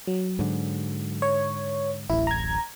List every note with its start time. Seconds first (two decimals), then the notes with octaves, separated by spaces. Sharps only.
0.07 F#3
0.39 G#2 D3
1.22 C#5
2.09 D1 A1 E4
2.27 A#5 G#6